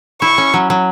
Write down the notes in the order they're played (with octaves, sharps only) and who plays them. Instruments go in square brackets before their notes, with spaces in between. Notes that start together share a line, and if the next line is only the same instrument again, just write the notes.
[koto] E4 [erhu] C#6
[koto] C#4
F#3
F#3